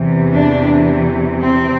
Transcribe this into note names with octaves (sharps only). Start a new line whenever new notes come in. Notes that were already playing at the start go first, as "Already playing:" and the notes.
Already playing: E2 C3 E3
D4
C4